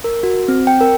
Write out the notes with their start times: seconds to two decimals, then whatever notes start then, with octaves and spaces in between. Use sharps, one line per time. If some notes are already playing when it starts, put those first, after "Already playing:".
0.04 A#4
0.23 F#4
0.48 C4
0.67 G5
0.81 A#4